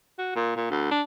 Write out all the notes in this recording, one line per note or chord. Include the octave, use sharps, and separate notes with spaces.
F#4
A#2
A#2
D2
D4